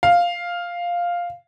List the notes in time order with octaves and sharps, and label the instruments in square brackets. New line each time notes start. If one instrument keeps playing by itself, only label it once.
[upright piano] F5